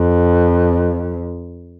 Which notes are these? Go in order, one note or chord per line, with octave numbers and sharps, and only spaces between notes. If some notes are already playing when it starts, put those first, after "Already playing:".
Already playing: F2